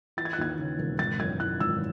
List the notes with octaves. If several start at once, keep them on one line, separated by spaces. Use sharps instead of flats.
E3 A6
G#6
F#6
D#2 G#6
C#3
E1
G#1 A6
F#2 G#6
E3 F#6
G#1 E6